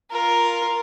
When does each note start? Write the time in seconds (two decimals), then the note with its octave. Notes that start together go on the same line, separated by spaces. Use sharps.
0.11 F4 A#4